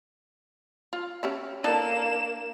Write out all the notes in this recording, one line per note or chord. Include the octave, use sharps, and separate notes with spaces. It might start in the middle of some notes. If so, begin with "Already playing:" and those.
F4
C#4 G4 E5
A#3 D4 E4 A4 E7